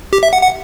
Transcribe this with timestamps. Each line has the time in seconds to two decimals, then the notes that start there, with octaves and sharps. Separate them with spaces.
0.13 G4
0.23 E5
0.33 F#5
0.43 F#5